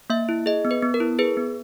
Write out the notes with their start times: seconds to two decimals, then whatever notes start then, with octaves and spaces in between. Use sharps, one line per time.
0.10 A#3 E5
0.29 E4
0.46 G#4 D#5
0.65 B3
0.71 B4
0.82 B3
0.94 A#4
1.00 E4
1.19 G#4 B4
1.37 B3